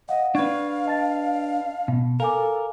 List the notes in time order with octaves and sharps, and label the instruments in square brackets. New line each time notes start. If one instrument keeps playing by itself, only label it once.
[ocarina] D#5 [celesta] F5 F#5
[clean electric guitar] D4 B4 [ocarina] F5 [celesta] C#6 G#6
[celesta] D#5 A5 A6
[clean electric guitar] B2
[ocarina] A4 [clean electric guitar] A#4 [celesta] F5 G#5 D6